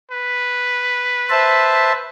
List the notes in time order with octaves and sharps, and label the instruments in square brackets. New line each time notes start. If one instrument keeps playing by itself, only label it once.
[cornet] B4
[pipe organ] C5 E5 A5